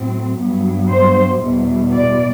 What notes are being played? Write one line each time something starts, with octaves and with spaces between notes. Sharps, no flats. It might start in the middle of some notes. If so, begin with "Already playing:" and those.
Already playing: A2 F#3 C4
G2 F#3 B3
C5
E2 B2 G3
D5